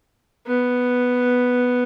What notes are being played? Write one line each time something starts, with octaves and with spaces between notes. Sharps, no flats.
B3